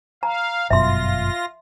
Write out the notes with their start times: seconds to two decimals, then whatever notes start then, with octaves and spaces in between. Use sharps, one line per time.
0.23 F5 A#5
0.70 G1 F#2 B2 F4 E5 C6 A#6